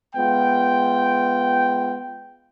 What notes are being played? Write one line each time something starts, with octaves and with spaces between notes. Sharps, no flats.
G#3 B3 F4 G5